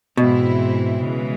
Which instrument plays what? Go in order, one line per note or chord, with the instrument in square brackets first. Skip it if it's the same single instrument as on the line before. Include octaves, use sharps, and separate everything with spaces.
[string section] G#2 E3 G#3 C4 E4 [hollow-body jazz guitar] B2
[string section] C#3 E3 G#3